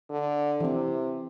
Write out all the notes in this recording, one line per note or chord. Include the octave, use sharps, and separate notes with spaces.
D3
C3 E3 C4